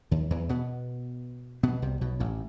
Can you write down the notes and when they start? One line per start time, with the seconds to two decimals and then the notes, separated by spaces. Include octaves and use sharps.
0.11 D#2 D#3
0.30 E2 E3
0.49 B2 B3
1.63 B2 B3
1.82 C2 C3
2.01 B1 B2
2.20 A1 A2